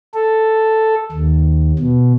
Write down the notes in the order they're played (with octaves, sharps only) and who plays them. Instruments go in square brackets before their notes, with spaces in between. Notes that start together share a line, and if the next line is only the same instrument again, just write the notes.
[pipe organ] A4
D#2
B2